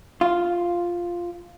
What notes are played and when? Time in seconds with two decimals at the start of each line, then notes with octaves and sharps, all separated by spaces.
0.21 F4